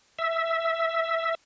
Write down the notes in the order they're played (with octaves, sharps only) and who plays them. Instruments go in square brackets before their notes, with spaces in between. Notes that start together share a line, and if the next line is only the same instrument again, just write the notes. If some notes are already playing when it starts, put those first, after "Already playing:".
[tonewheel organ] E5